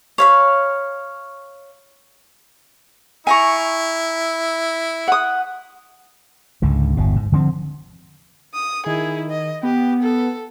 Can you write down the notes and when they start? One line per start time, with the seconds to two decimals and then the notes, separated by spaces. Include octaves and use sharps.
0.18 C#5 F5 B5
3.27 E4 G#5 A#5 C#6
5.08 F#5 D#6
6.62 C#2 G#2 D3
6.97 G1 E2 B2
7.16 G#2
7.32 D3 F3 G#3 C4
8.54 D#6
8.86 D#3 E4 G#4
9.31 D#5
9.63 B3 G4
10.02 A4